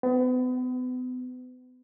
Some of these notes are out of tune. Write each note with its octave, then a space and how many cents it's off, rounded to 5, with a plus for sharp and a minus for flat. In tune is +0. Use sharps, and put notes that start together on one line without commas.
B3 +35